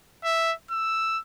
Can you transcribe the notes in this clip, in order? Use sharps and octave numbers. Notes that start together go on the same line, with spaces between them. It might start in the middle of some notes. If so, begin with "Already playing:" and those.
E5
E6